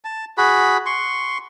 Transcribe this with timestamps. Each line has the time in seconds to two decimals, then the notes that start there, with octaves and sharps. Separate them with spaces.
0.05 A5
0.38 F#4 G#4 B5
0.86 C6 C#6